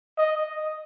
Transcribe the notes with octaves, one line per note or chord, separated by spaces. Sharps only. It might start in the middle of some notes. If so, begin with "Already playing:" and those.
D#5